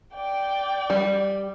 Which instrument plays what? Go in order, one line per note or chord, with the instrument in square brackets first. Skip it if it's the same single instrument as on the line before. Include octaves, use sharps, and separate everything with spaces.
[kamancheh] D5 G5
[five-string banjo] G3